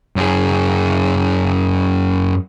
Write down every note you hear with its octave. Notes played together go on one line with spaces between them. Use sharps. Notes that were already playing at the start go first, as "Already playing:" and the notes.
F#2 G#4